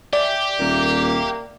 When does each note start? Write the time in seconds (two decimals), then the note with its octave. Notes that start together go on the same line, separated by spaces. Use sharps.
0.13 G4 D5 E5 D6
0.59 D#1 A#3